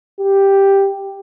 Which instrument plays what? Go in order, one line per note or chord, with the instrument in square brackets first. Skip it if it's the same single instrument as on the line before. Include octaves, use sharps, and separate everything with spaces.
[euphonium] G4